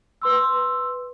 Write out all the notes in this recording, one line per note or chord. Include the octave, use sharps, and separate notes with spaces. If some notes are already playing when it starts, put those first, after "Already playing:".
B4 C6 E6